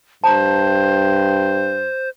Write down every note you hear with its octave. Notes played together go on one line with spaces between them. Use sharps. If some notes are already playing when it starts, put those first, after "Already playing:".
G2 C5 A5 A#5